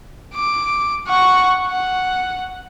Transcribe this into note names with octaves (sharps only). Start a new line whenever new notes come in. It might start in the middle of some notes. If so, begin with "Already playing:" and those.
D6
F#5 C#6
F#5